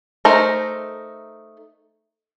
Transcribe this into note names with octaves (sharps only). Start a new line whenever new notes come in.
A3 D#4 A#4 C5